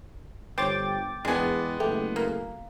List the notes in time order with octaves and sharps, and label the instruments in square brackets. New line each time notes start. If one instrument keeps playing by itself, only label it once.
[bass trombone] G1 [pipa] C5 C#5 [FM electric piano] G5 D6 A6
[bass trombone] E2 [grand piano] G#3 B3 [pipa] D4 G#5
[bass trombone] F#1 [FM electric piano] A3 [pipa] G4
[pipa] A#3